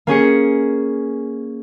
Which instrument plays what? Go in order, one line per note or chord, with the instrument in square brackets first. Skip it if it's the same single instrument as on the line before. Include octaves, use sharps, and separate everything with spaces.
[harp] A#3 C#4 G#4 C#7